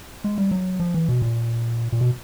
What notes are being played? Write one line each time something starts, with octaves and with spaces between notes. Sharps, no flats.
G#3
G3
F#3
F3
E3
B2
A#2
A#2
B2